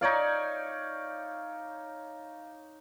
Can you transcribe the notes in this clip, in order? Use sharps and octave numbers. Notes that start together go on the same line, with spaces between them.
D#4 C#5 D5 F5